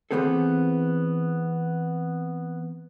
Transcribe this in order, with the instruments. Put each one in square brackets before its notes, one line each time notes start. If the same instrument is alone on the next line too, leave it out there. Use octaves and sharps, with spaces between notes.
[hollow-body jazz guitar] E3 G#3 B3 C4 G#4 A4